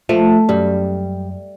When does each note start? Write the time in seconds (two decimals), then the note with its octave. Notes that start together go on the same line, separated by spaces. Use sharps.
0.09 F3 A3
0.49 F#2 G3